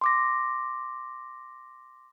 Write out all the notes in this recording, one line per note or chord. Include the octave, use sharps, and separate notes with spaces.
C6 D6 A#6